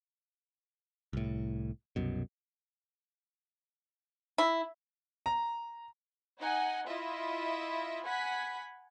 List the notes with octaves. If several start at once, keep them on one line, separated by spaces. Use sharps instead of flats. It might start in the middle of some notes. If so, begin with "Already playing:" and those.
C2 A2
C2 F#2 B2
E4
A#5
D#4 D#5 F#5 G#5
E4 F4 D#5 E5
F#5 G#5 B5 B6